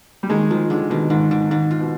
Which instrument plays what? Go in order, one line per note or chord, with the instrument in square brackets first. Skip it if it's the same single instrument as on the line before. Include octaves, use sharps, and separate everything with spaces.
[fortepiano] G3
[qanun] D#3 [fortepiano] G#3
[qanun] D#3 [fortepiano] F3
[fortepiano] D3 [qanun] G#3
[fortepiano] B2 [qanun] D#3
[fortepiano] G#2 [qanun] D#3
[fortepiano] G#2 [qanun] D#3
[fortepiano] G#2 [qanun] D#3
[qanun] F4
[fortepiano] B2